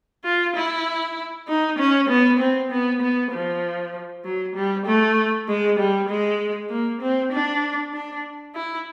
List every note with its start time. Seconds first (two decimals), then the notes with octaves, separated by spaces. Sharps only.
0.24 F4
0.56 E4
1.48 D#4
1.79 C#4
2.09 B3
2.39 C4
2.71 B3
3.02 B3
3.32 F3
4.24 F#3
4.55 G3
4.86 A3
5.48 G#3
5.79 G3
6.09 G#3
6.70 A#3
7.01 C4
7.32 D4
7.94 D4
8.55 E4